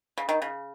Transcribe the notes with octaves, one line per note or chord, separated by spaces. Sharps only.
C#3
D#3
C#3